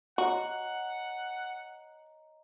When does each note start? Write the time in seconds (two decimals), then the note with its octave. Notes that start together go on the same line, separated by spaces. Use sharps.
0.18 F#4 C#5 D#5 F#5 A#5